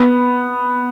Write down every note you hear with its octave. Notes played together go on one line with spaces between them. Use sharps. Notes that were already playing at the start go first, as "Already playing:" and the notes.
Already playing: B3